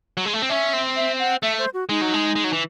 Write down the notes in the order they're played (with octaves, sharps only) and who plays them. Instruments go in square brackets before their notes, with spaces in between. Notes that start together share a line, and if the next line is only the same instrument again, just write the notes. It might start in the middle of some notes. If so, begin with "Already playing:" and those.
[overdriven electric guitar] F#3
G#3
A3
C4
[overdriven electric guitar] C#4 [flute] E5
[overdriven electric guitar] C4
[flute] E5
F#5
[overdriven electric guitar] A3 [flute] E5
[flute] C5
F#4
[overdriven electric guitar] G#3 [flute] D#4
[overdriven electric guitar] F#3
G#3
G#3
F#3
E3